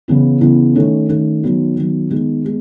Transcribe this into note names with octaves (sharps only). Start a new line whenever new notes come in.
C#3 E3 B3 E4
C#3 E3 B3 E4
D#3 A3 C#4
D#3 A3 C#4
D#3 F#3 B3
D#3 F#3 B3
D#3 G#3 B3
G#3 B3